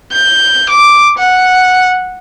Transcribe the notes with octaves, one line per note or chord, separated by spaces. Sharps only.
G6
D6
F#5